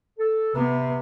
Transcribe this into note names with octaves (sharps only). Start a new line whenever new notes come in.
A4
C3 B3